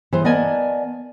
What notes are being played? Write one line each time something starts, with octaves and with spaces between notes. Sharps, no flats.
E3 G3 C5
B3 A#4 D5 D#5 G#5 A5